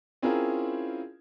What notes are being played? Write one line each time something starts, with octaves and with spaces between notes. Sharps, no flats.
C4 C#4 E4 F4 G#4 A#4